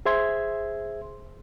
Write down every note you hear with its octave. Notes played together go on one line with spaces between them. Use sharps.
G#4 C5 E5 C6 G#6